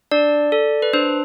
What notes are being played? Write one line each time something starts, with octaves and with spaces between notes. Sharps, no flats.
D4 D5
A4
B4
D4 C5